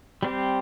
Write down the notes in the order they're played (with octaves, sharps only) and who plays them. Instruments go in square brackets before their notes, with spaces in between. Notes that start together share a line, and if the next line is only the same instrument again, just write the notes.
[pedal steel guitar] G3 C4 G4